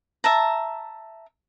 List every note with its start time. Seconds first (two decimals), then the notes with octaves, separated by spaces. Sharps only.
0.24 E5 A5 A#5